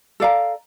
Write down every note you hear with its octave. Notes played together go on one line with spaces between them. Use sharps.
A4 D5 F5 A#5